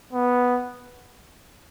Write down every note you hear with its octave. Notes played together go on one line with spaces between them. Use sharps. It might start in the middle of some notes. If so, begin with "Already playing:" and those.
B3